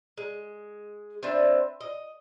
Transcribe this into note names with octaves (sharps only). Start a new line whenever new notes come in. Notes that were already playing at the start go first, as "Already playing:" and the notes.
G#3
C4 D4 B4 E5
D#5